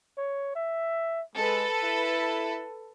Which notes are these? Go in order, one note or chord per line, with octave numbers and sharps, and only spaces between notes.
C#5
E5
G#3 A4 B4
E4